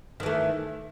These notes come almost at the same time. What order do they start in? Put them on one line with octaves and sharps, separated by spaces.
D#3 E3 A3